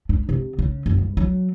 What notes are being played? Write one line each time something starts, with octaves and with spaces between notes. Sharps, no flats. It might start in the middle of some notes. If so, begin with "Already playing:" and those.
D4
C3
C#3
F#1
G2
F#3